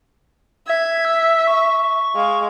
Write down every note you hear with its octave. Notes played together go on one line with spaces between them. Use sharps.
E5 G#6
E6
C#6
G#3 F5